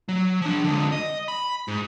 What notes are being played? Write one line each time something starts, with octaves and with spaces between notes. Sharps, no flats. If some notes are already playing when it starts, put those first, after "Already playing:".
F#3
F3 D4
D3 G#3
D#5
B5
G#2